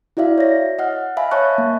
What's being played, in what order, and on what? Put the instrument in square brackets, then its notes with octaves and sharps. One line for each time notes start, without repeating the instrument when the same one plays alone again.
[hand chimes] E4 F#4 D5 E5 F5
C#5 A#6
D#5 F#5 F6
E5 F5 G#5 B5
C#5 D#5 E5 A5 C#6 F#6
A#3